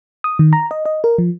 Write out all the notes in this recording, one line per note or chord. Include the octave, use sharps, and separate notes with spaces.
D#6
D#3
A#5
D#5
D#5
A#4
F3